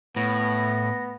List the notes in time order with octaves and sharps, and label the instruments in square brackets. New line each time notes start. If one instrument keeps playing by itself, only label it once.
[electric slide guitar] A2 [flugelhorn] B3 [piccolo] A#6